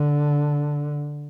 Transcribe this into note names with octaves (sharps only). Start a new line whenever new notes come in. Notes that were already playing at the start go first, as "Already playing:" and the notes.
Already playing: D3